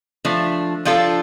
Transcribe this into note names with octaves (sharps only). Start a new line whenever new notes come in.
F3 A3 D4
F3 D4 F4 A4